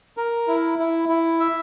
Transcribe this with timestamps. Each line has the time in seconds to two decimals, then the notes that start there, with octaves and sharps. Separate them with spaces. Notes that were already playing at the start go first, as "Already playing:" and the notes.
0.17 A#4
0.48 E4
0.79 E4
1.09 E4
1.40 E5